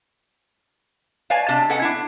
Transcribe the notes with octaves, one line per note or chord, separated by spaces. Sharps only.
B4 C#5 D5 F5 G#5 A5
C3 D4 D5 A5
C#4 A4 B4 D#5 F#5
D4 E4